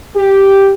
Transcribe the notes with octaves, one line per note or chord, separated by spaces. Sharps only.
G4